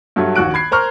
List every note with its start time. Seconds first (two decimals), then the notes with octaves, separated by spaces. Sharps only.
0.16 G2 F#3 A4 E5 G#6
0.36 A#1 D#2 F#4 F#6 D7
0.54 B5 G#6 C7
0.71 A#4 C5 A#5 C#6 F6